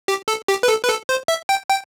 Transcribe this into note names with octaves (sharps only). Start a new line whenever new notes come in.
G4
A4
G4
B4
A4
B4
A4
C5
E5
G5
G5